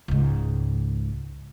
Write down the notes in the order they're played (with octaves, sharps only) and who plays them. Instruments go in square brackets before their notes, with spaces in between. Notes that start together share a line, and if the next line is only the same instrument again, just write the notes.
[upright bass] C#2 G#2